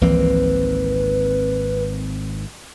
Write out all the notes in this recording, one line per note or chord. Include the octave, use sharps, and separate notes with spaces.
G#1 C#2 E3 F3 A#3 C4 B4